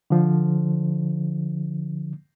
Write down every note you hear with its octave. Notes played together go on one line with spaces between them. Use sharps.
D3 F3